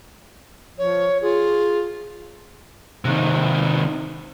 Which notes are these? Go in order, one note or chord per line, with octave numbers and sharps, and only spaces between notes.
F3 C#5
F4 G#4
C3 D#3